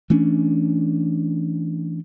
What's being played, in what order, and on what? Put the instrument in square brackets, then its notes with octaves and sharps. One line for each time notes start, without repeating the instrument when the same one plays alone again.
[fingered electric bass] E3 A3 C#4 D4